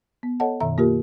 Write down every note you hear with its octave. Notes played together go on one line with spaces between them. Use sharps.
B3
A4 C#5 D#5 F#5 A5
F#2 B2 D#3 E5 A#5
A#3 F4 G4 A#4